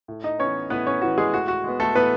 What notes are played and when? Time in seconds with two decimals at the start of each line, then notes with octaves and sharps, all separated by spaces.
0.08 A2
0.24 D#4 D#5
0.39 E3 B3 C#4 C#5
0.70 A2 B3 B4
0.86 C#4 C#5
1.02 E3 B3 F#4
1.18 G#3 G#4
1.33 A2 F#4
1.48 F#4
1.64 G#3 B3
1.80 A3 A4
1.95 A2 B3 B4